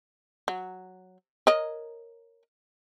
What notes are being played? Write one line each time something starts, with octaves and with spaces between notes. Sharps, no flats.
F#3
A#4 C#5 D#5